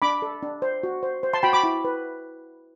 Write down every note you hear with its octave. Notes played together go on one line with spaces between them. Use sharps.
D4 B5 D6
A4
D4
C5
F#4
C5
C5
A5 C6
F#4 G5 B5
B5 D6
E4
B4